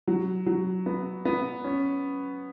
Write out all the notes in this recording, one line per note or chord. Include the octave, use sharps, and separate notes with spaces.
F#3
F#3
B3
B3
C#4